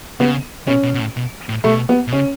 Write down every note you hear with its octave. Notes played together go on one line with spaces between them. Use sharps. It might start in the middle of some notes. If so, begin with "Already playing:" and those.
C#3 B3
B2 C#4
B2
B2
A2
B2
A2
B2 A3
B3
B2
C#3 C#4